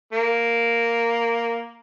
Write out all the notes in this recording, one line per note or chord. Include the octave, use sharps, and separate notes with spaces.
A#3